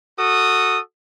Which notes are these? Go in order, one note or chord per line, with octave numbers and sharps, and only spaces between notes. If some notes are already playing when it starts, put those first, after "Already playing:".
F#4 A4 D#6